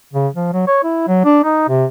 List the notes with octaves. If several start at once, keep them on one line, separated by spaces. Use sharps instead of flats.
C#3
F3
F#3
C#5
E4
F#3
D4
D#4
C3